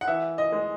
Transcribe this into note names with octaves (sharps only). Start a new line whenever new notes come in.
F#5
E3 E5
D#5
G#3